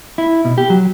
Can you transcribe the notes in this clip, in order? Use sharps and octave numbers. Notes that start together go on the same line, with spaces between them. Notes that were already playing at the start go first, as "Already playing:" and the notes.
E4
B2
G4
F#3